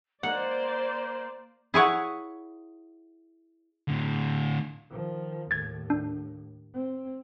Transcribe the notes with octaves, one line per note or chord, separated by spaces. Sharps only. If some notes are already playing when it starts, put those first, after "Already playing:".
A#3 C5 D5 F#5
E4 G#4 C#5 F#5
A2 D3
D#3 F3
D#2 A2 G#6 A6
D4
C4